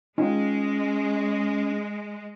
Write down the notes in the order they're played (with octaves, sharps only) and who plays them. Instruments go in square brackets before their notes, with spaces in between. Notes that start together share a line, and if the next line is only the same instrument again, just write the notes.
[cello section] G#3 [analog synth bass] C#4 [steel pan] D#4 F4 G5